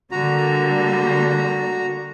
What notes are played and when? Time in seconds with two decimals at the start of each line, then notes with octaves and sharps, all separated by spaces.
0.11 D3 G3 A#3 F#4 A#5